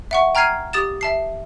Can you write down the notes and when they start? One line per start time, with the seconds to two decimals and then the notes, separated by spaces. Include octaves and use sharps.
0.11 E5 F#5 C#6
0.35 G5 A#5 F6 G#6 C7 D#7
0.73 G4 D#6 A6 E7
1.01 E5 A5 C7